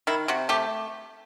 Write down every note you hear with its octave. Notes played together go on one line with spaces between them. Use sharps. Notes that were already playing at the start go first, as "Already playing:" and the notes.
D#3 E4
C3 F#4
A3 G4